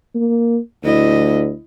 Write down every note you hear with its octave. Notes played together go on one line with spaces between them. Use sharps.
A#3
D2 E4 D#5